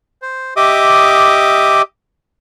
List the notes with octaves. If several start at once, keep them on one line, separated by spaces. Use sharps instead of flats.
C5
G4 D#5 E5 D6 D#6